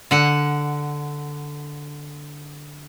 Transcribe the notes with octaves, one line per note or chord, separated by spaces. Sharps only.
D3 F#5